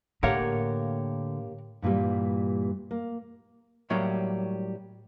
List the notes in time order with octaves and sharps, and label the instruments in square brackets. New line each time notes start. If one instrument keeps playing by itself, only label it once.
[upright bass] A2 [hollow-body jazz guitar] D3 F5 [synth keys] A#3 G4 [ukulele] A#4 C#5 F#5
[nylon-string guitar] G2 A#2 E3 G3
A#3
[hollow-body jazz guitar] A2 F#3 G3 A#3